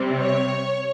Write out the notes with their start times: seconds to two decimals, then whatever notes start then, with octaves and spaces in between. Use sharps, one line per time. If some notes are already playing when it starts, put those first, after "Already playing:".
Already playing: C3 G3 C4
0.19 C#5